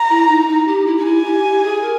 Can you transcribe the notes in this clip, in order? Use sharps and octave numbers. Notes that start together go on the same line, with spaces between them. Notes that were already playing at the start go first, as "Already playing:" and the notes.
Already playing: A#5
E4
D#4
D#4
G4
E4
D#4
E4 G#5
G4
G4
G#4
A#4